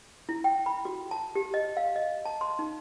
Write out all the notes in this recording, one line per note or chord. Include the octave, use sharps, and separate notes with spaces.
E4
G5
B5
F#4
A5
G4
D#5
F5
D#5
A5
C6
D#4